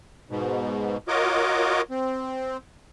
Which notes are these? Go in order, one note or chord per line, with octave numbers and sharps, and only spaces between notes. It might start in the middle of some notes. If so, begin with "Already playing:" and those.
G#2 B2
F4 F#4 A#4 C#5 D#5 D6
C4